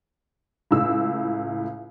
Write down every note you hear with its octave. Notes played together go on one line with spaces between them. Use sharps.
C#2 A2 E6